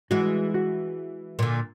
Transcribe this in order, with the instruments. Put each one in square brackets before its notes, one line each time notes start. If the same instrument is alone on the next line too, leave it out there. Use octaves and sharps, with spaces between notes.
[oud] E3 G#3 [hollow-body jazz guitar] F#4 F#5
[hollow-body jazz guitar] F#4
[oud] A#2 D3